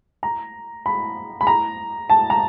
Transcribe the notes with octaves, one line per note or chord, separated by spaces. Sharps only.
A#5
B5
B5
A#5
A5
A#5